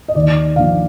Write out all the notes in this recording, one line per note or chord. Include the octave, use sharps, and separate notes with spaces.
D#5
D#2 D5
D3 F3 F5